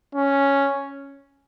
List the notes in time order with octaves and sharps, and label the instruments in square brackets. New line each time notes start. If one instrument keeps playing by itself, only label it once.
[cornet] C#4